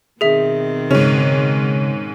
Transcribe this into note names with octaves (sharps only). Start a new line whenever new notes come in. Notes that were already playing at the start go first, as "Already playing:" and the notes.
B2 D#3 C4 G#4 E5
G#2 C#3 C#4